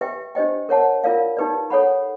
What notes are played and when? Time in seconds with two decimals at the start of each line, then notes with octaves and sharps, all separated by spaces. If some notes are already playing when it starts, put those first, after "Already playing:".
0.01 G4 B4 E5 G5
0.35 D4 G4 C5 D#5 G5
0.69 A#4 C#5 F#5 A5
1.04 F4 A#4 D5 F5
1.37 D#4 G4 B4 D5
1.70 A4 C#5 F#5 B5